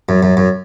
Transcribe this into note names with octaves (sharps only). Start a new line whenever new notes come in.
F#2
F#2
F#2